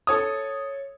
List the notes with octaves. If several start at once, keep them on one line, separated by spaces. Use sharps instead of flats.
A4 C#5 D#6